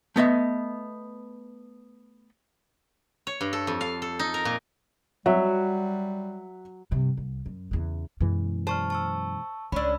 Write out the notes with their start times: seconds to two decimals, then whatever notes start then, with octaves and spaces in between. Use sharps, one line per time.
0.16 A3 B3 D#5 E5
3.27 C#5
3.41 G2
3.53 A4
3.67 F2
3.81 F5
4.02 A4
4.19 D#4
4.34 A#4
4.45 A#2
5.26 F#3 G3 F#4 E5
6.91 G2 C3
7.17 C2
7.46 F#2
7.71 E2 C#3
8.21 F#2 B2 E3 G#3
8.67 C5 A5 C#6 F6
8.90 A5 C#6 E6
9.72 C#2 C#4 D4 B5 E6